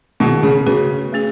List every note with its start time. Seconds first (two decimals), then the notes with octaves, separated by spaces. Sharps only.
0.20 B2 D#3 A3 E4 G#4
0.43 C#3
0.66 C#3 B3 F#4 B4
1.13 A3 C#4 G#4